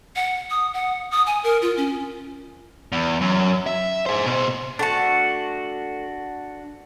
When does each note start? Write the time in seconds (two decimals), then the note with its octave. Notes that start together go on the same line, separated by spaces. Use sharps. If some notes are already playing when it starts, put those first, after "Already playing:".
0.16 F#5
0.50 D#6
0.74 F#5
1.11 D#6
1.26 G#5
1.44 A#4
1.62 F4
1.77 C#4
2.92 E2
3.21 F#2
3.67 E5
4.06 G#4 C5
4.26 B2 C5
4.79 A3 D4 F#4 F#5 A5